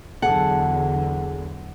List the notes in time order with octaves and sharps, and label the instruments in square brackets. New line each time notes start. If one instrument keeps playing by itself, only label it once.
[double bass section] E2 D3 F#3 [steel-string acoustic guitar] G#4 A4 [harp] F#5